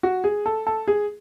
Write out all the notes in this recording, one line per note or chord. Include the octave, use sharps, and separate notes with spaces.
F#4
G#4
A4
A4
G#4